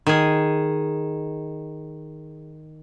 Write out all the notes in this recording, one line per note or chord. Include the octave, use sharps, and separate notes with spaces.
D#3 G#4